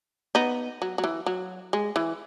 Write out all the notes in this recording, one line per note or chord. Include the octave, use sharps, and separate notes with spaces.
B3 D#4
F#3
F#3
E3
F#3
G#3
E3